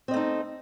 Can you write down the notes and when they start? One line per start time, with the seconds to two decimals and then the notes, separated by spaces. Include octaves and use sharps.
0.08 C4
0.11 D#5
0.14 A3
0.16 D#4